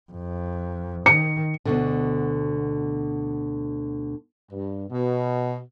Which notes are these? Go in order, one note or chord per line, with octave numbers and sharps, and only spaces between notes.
F2
D#3 C#7
D2 B2 D3
G2
B2